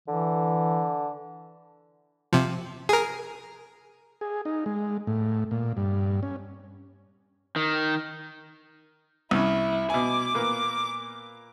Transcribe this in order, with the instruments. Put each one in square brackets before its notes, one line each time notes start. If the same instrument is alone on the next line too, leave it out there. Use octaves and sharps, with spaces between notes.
[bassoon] D3 [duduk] E3
[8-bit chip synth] C3 F3
G#4 A#4
[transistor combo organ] G#4
D#4
G#3
A2
A#2
G2
C#4
[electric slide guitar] D#3
[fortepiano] C2 C#4 [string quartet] E4
[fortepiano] B2 G#5 [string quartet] D6
[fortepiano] A#2 A#3 B3